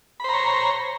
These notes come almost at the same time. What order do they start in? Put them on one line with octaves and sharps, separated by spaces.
B5 C5 A#5 C#5